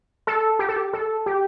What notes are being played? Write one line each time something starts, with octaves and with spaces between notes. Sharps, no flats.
A4
G4
A4
G4
A4
G4